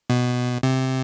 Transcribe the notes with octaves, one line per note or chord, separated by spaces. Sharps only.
B2
C3